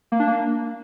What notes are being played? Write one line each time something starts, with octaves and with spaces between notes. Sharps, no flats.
A#3
D4
A#3